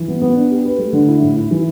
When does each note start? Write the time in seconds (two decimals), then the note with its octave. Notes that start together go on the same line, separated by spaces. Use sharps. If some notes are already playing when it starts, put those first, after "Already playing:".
Already playing: E3
0.08 B3
0.22 B3
0.36 D4
0.51 G4
0.65 B4
0.79 A3
0.93 D3
1.08 E4
1.22 A2
1.36 E4
1.51 E3